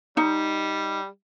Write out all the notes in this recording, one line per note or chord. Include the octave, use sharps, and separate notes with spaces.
G3 D#4